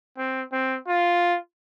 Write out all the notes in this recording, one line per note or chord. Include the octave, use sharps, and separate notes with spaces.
C4
C4
F4